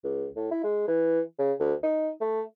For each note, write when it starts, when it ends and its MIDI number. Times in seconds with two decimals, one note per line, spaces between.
0.04 0.27 37
0.36 0.47 45
0.51 0.60 64
0.63 0.84 56
0.87 1.20 52
1.38 1.53 49
1.60 1.74 38
1.83 2.11 63
2.21 2.42 57